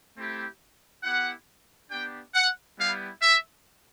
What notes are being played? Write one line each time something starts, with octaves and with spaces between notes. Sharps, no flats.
A3 C4 E4 G4
B3 E4 G4 F#5
B3 D4 G4 G5
F#5
G3 B3 E4 G4 F5
E5